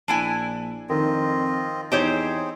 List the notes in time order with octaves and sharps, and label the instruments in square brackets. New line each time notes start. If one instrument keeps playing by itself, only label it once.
[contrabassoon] A#1 [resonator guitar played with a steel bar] D4 E4 G#5
[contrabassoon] F2 [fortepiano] D#3 [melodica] C4 F4 D#5
[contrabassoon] E2 [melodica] C4 G#4 [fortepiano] D#4 [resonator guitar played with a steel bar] G4 C5 C#5